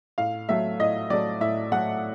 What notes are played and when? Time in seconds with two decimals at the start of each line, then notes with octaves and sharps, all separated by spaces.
0.18 A2 F5
0.49 F#3 A3 E5
0.80 A2 D#5
1.10 F#3 A3 D5
1.41 A2 E5
1.72 F#3 A3 F#5